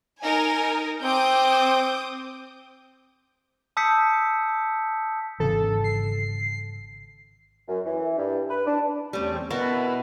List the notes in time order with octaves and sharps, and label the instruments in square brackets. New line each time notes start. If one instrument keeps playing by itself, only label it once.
[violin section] D#4 A#4 G#5
[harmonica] C4 [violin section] D6 D#6 G6
[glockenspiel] A5 D#6 E6 G6 B6 C#7
[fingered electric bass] G#1 C#3 E3 [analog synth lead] A4
[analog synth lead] C7
[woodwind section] F#2
E3
G2
B4
D4
[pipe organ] E2 C4 C#4 [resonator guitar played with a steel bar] G3 A3
[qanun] B2 F#4 A5 [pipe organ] E4 B4 [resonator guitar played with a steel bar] A#4